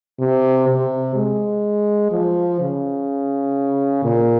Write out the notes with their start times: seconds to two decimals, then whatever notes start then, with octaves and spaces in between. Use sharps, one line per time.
0.20 C3
0.68 C3
1.15 G#3
2.12 F3
2.60 C#3
4.04 A#2